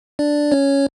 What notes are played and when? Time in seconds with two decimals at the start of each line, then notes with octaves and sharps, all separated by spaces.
0.19 D4 D5
0.52 C#4 C#5